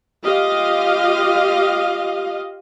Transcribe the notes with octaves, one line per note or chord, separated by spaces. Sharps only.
F4 G4 D#5 F5